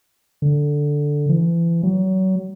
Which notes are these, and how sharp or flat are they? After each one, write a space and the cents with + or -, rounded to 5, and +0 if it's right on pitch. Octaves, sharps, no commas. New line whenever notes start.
D3 +0
E3 +35
F#3 +30